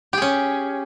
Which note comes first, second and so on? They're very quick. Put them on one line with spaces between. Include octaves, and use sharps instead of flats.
G4 G#4 C#4